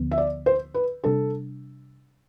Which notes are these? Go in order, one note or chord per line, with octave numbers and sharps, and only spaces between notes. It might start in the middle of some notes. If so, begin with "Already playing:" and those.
Already playing: D2 D3 F3 B3
E5
D5
C5
B4
C3 G3 D4 A4